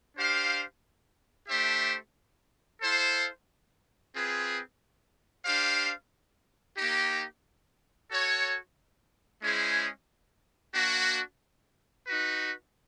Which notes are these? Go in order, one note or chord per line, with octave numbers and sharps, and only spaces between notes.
D4 G4 C5 F5
A3 D4 G4 C5 E5
E4 A4 C5 F5
C4 F4 G#4 B4
D4 G4 C5 F5
A#3 D#4 G4
F#4 A4 C#5
G#3 C#4 E4 G#4 C5
A#3 D4 F#4
D#4 F#4 B4